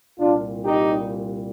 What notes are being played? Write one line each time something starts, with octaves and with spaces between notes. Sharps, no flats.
C2 A#2 G3 D4 F4
D#4 G4